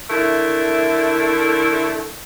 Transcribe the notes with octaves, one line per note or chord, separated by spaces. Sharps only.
D3 A3 E4 A#4